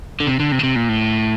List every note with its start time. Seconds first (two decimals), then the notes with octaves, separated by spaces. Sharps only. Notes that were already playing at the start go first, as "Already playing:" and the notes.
0.20 D3
0.27 C3
0.40 D3
0.52 C3
0.59 D3
0.63 C3
0.76 A#2
0.89 A2